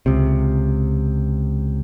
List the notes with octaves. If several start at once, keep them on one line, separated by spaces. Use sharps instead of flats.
C#2 C3